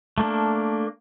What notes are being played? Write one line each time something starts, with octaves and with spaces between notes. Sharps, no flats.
A3 A#3 D4